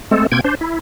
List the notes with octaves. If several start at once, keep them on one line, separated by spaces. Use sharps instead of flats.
G#3 A3 C4 A4
B2 A#3 C4 G5 G#6
D4 C5
E4